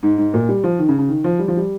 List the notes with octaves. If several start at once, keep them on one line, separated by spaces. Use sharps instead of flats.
G#2
G#2
A#2
G3
F3
D#3
C#3
C#3
D#3
F3
G3
F3
G3